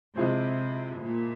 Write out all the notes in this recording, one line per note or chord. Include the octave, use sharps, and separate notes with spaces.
C3 F3 G#3 E4 G#4 C5
A#2